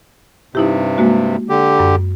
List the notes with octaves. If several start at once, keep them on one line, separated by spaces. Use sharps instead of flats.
G2 C3 D#4 E4 G4
G#3 A#3 F#4
D3 G4
F#2